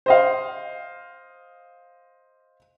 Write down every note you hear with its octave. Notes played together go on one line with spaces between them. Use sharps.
C5 D#5 F5